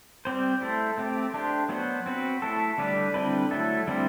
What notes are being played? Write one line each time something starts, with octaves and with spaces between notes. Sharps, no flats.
G3 C4 G4 C5
A3 E4 A4 C5
A3 C4 G4
A3 D4 G4 C5
F#3 B3 F#4 C5
C4 F#4 B4
A3 E4 A4
D3 G3 D4 G4 B4
D3 G3 C4 E4 B4
F#3 A3 E4 A4
D3 G3 C4 E4